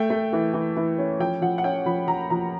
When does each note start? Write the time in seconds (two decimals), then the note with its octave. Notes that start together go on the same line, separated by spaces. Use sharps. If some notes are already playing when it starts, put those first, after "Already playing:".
Already playing: A3 G5
0.10 A3
0.33 E3
0.54 E3
0.77 E3
0.99 C#4
1.20 F3 G5
1.42 F3 F#5
1.58 F#5
1.64 C#4 G5
1.86 F3 B5
2.08 F3 A#5
2.30 F3 A#5